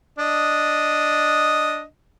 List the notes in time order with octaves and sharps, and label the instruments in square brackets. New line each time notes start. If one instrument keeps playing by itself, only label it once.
[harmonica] D4 D#5